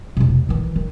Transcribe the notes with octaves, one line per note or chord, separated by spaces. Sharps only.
E1 C3
D#3 E3
D#3